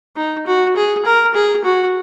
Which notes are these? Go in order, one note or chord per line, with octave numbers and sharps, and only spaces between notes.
D#4
F#4
G#4
A#4
G#4
F#4